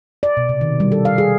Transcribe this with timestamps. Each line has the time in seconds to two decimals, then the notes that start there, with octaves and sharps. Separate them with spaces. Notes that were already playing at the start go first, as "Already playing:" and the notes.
0.23 D5
0.37 B2
0.49 C3
0.61 D#3
0.80 G3
0.92 A4
1.05 F5
1.18 G#4